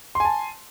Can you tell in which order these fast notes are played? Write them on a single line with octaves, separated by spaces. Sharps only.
C6 G#5 A5